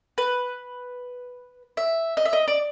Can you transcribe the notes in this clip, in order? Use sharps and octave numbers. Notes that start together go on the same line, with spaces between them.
B4
E5
D#5
E5
D#5
D5